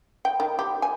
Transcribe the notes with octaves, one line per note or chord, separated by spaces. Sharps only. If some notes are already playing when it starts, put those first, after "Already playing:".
G5
D#3
G4
G#5